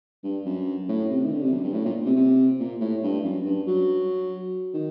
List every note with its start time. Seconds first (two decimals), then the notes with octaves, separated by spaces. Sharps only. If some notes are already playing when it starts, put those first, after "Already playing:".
0.24 G2
0.45 F#2
0.88 A2
1.10 C3
1.24 D#3
1.31 D3
1.42 C3
1.52 F#2
1.63 G2
1.73 A2
1.85 A#2
2.06 C3
2.16 C3
2.60 A#2
2.80 A2
3.03 G2
3.24 F#2
3.46 G2
3.67 F#3
4.74 D#3